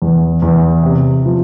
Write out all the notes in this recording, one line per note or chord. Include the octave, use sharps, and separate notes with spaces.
E2
E2
C3
F3